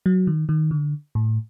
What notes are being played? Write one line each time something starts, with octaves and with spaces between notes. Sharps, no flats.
F#3
D#3
D#3
D3
A2